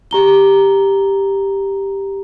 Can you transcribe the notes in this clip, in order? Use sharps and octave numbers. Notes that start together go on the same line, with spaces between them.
G4 A#5 G7